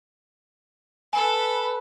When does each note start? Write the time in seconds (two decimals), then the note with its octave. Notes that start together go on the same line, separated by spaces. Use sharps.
1.13 A4 B4 G#5 B5